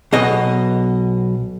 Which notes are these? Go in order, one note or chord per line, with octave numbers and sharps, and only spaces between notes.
B1 B2 D#5